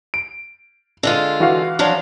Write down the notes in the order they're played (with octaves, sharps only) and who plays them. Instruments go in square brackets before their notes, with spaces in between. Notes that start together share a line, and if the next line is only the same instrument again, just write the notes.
[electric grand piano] D7
[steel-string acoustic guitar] D3 G#3 F4
[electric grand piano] E3 F#4 F5
[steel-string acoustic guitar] F3 F#3 D4